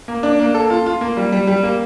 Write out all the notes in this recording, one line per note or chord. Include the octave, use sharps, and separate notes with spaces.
A#3
D4
A#3
A4
F4
F4
A#3
G3
G3
G3
A#3